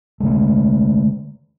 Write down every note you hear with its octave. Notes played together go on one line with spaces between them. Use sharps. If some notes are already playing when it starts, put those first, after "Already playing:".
D3 G#3 A3